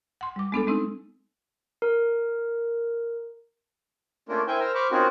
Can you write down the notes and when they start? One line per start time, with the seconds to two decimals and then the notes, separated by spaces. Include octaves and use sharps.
0.21 F#5 C6
0.36 G3 D6
0.52 G#3 B3 D4 A4
0.67 G#3 C4 D#4 E6
1.82 A#4
4.29 A3 A#3 C#4 D4 F4 A#4
4.47 E4 A#4 C5 E5 G5 G#5
4.60 A#4 C5 A#5 E6 F6
4.75 C5 B5 C#6 D6 F6
4.91 C4 C#4 D#4 F4 F#4 A#4